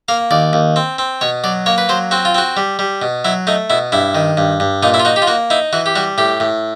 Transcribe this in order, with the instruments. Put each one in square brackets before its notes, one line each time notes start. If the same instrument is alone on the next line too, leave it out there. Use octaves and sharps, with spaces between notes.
[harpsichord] A#3 F5
D#2 D5
D#2
C4
C4
B2 C#5
F#3 D5
A#3 C#5
B4
F#3 C5
C4 F#4
F4
C4 F#4
G3
G3
B2
F#3 E4
A3 D#4
B2 E4
G2 E4
D#3
G2
G2
A#2 D#4
E4
F4
D#4 F#4
G4
F4
A#3 F#4
D#4 E4
E3 F#4
G4
G3 F#4
A2 G4
A2